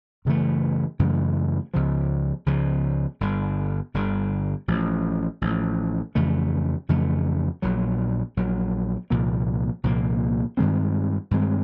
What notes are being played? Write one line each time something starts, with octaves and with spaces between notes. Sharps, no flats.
F#2 C#3 E3 A3
F#2 C#3 E3 A3
C#2 C#3 F3
C#2 C#3 F3
G1 G2 D3
G1 G2 D3
A1 A2 F3
A1 A2 F3
F2 C#3 E3 A3
F2 C#3 E3 A3
A#1 A#2 F#3
A#1 A#2 F#3
C2 A#2 F3 A#3
C2 A#2 F3 A#3
G2 D#3 G#3 C4
G2 D#3 G#3 C4